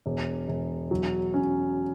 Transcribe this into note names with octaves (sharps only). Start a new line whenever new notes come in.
E1
E1
F#3
C#4